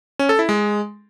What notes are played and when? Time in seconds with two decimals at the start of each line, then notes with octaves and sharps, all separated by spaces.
0.19 C#4
0.29 A4
0.39 E4
0.49 G#3